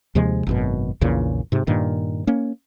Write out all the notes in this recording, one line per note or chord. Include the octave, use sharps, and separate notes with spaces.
D#2 C3 F3 G#3
G#1 F#2 B2
A#1 E2 A#2 C#3
G#2 C3
G2 A#2 D#3
A#3 C#4